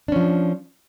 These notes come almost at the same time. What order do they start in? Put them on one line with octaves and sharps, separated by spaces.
D4 C#4 F3